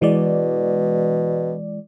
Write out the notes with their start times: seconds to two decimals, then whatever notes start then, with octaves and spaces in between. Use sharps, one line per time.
0.02 B2 E3 G#3 D5